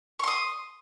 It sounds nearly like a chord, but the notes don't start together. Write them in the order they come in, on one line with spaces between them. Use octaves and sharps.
C#6 C6 D#6